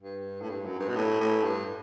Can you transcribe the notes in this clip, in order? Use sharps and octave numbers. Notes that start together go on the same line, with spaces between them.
G2
A2
G2
F#2
G2
B2
A2
A2
G2